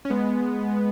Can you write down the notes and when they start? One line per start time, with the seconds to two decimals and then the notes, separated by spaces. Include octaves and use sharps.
0.05 C#4
0.10 G#3 B3